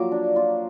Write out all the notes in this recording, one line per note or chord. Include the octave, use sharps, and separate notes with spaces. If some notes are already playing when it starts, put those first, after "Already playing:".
Already playing: F3 F#3 A#3 D6
D4
F4